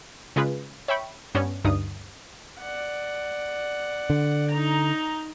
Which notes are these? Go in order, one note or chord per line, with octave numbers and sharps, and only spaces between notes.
C#3 G#3 F4 G#4 B4
C#5 E5 G5 B5 C#6
G2 B3 C#4 D4
D2 G2 D#4 D#6
D5 F#5
D3
D#4 A#5